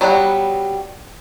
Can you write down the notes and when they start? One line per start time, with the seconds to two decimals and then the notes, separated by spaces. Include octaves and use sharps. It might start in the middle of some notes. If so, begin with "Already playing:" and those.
0.01 F#3 G3 B3 A4 F#5